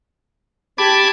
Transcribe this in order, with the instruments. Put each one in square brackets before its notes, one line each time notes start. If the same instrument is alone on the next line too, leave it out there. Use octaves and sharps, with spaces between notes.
[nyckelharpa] G4 A5 [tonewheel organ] B5 D6 G#6